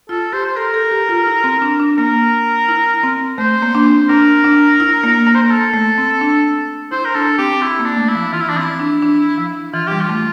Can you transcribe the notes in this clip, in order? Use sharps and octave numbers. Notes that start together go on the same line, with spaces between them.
F4 A4
G4 C5
C5
A4 A#4
A4
G4
F4
E4
C4
D4
D4
A#3 A#4
E4
C4
A3 C5
A#3
D4
C4
D4 A#4
D4
E4
A#3
A#3
C5
A#4
A4
A3
C4
D4
E4 C5
A#4
D4 A4
C4 G4
C4 E4
A#3
D4
A3
E4
F3
E3 F4
E4
D4
C4 E4
D4
D4
F3
E3 F4
G3 G4
F4
A3